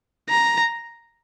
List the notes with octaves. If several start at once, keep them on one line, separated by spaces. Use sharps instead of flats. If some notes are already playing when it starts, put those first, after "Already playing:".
A#5